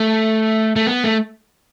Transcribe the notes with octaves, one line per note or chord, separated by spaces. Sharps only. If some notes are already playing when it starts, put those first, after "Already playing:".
Already playing: A3
A3
B3
A3